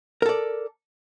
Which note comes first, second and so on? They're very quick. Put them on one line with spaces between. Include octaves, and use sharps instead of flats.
A#4 A4 D5